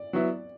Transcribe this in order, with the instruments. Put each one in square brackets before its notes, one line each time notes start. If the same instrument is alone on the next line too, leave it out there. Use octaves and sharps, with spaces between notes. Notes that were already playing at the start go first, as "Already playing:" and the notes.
Already playing: [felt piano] D5
[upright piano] F#3 B3 E4